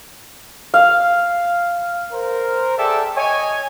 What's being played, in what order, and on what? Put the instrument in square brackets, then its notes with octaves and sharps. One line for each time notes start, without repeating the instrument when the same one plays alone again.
[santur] F5
[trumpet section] A#4 C5
G#4 A4 D5 E5 G5 A5
C#5 D#5 G#5